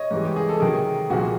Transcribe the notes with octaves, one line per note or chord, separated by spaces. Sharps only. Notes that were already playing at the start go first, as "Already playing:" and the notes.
Already playing: C#5 D#5
G#2 E3 G3
G4
G#4
A4
C3 D#3 F#3 G#4 A#4
C2 A#2 F3 A#3 F#4 G#4